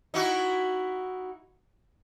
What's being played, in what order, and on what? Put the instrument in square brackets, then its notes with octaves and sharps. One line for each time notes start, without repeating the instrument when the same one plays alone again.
[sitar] D#4 E4 F#4